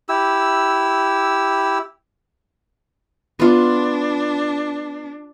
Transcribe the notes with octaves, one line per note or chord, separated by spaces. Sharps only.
E4 G4 E6
B3 D4 F4